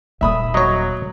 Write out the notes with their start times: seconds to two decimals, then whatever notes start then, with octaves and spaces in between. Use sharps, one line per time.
0.21 D#1 A#3 E5 B5 D#6
0.54 F#3 C#5 D#5